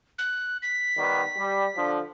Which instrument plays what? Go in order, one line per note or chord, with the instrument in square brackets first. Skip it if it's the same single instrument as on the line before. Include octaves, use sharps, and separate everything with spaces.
[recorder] F#6
B6
[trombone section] D#3 G3 B3
G3
D3 F3